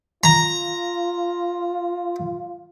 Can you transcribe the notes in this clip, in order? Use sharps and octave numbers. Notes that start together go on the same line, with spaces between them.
F4 A#5